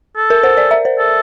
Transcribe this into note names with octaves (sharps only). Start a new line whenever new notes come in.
A4
A#4
C5
D5
E5
C5
A4